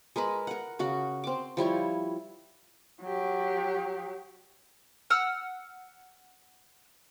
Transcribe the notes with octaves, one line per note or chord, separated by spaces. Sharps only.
G#3 A#4 B4 B5
A#4 F#5
C#3 F#4 F#5
C4 D6
F3 G3 E4 C#5
F#3 G4
F#5 E6 F6